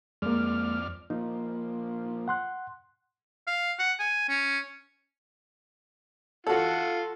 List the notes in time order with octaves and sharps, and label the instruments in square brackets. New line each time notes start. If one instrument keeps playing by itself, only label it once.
[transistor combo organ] F2 D5 F6 [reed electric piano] G#3 A#3
[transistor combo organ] F3 A#3 [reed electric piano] D#4
[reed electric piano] F#5 C6 F#6
[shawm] F5
F#5
G#5
C#4
[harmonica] F4 F#5 [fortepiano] F#4 A4